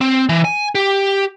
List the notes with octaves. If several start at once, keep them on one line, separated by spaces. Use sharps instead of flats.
C4
E3
G#5
G4